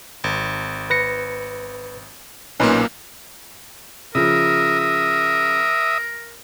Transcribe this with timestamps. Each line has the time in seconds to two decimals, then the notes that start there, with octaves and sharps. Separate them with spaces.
0.24 G#1
0.90 B4 A#6 C#7
2.60 B1 A#2 A#3 C#4 D#4 B4
4.15 C#3 F3 A#4 E5 D#6
4.80 A#4